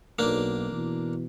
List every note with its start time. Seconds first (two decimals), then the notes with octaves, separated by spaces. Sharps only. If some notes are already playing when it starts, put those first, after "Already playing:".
0.19 B1 A#3 D4
0.70 B2 E3